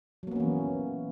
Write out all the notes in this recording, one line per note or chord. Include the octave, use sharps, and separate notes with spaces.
E3 F#3 A#3 B3 C#4